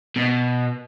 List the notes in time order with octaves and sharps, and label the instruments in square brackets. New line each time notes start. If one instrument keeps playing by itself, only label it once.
[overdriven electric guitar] B2